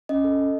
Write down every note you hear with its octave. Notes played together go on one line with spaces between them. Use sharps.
C#4 D#5
A4
A4